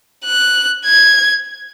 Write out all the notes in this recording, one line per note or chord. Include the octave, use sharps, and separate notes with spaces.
F#6
G#6